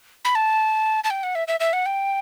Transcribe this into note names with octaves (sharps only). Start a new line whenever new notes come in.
B5
A5
A5
G5
F#5
E5
E5
E5
F#5
G5